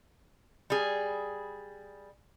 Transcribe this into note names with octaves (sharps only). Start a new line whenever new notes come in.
G3 G#4